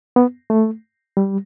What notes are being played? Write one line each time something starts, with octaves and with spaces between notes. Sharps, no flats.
B3
A3
G3